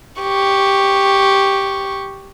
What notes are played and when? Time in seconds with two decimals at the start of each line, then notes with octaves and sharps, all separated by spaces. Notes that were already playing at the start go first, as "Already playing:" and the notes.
0.22 G4 C#6